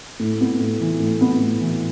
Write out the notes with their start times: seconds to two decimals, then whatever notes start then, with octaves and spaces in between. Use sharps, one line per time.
0.20 A2
0.41 B3
0.60 A2
0.80 E3
1.00 A2
1.21 B3
1.40 A2
1.60 E3